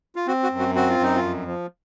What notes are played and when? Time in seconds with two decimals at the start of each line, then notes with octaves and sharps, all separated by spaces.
0.16 F4
0.27 C4 F#4
0.43 F#4
0.52 F#2
0.60 F#4
0.75 C4 F#4
0.89 F4
0.99 F#2 D#4
1.16 F4
1.23 F2
1.47 F3